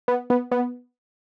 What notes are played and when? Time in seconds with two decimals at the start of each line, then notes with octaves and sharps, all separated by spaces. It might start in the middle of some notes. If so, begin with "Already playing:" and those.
0.08 B3
0.30 B3
0.52 B3